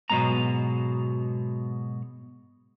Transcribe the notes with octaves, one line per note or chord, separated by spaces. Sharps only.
G#2 B2 F#3 G#3 B3 A#5